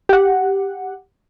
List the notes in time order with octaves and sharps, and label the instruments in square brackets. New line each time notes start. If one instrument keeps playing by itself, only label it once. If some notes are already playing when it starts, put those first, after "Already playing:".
[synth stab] G4 F#5